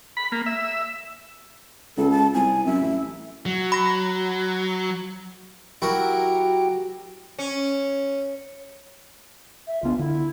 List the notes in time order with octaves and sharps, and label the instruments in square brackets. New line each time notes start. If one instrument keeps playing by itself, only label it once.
[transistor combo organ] B5
A#3
E5
[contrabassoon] C#2 [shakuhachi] A4
[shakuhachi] A5
[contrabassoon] C2 [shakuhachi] G#5
[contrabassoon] F#2 [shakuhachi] E5
[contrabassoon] A1
[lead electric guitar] F#3
[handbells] B5 A#6
[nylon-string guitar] F#3 [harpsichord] E4 F#4 A#4 [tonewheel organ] G4 G5
[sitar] C#4
[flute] E5
[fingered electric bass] C#2 B3 D4 [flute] F4
[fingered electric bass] D3 [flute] E4